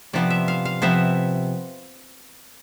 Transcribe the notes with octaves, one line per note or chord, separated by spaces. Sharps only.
C3 F3 B3 D5
E5
F5
F5
C3 F3 B3 E5